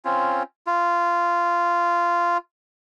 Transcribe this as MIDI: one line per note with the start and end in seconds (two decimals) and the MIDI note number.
0.05 0.43 60
0.05 0.43 61
0.05 0.43 65
0.67 2.38 65